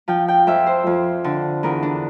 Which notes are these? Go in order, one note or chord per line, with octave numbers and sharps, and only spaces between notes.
F3 G5
G5
F2 E5
C5
F2
D3
E2 A#4
D4